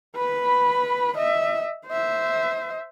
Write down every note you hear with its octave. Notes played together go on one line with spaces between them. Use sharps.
B4 B5
D#5 E5
C5 E5